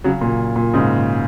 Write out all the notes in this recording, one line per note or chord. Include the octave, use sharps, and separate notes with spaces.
C#3 F#3
A#2
A#2
G#2 C#3